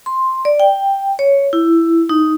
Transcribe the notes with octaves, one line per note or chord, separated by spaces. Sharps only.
C6
D5
G5
C#5
E4
D#4